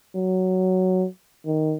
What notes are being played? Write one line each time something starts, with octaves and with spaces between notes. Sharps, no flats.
F#3
D#3